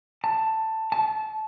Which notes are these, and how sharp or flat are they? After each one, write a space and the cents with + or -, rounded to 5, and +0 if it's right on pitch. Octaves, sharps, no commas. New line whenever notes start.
A5 +10
A5 -20